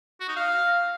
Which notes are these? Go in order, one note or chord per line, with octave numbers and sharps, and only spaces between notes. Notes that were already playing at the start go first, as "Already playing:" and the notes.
F#4
D#4
F5